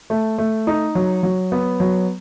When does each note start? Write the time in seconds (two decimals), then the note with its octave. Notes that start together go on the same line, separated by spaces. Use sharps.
0.10 A3
0.38 A3
0.67 D#4
0.95 F#3
1.23 F#3
1.52 B3
1.80 F#3